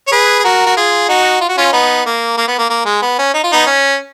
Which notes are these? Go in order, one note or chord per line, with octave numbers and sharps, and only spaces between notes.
C#5
G#4 B4
G#4
F#4 A#4
F#4
F4 G#4
D#4 F#4
F4
F#4
C#4 F4
B3 D#4
A#3
A#3
B3
A#3
A#3
G#3
B3
C#4
D#4
F4
B3 D#4
C#4